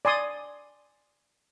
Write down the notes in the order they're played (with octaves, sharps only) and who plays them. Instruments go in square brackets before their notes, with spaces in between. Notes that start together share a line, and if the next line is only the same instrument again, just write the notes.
[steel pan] D5 G#5 C6 D#6